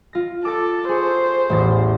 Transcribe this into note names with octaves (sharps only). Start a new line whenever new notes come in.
F4 A#6
A4 D6 A6
G#4 C5 C#6
A1 E2 A6